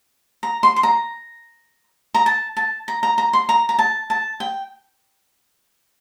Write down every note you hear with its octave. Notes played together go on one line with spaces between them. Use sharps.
A#5
C6
C6
A#5
A#5
A5
A5
A#5
A#5
A#5
C6
A#5
A#5
A5
A5
G5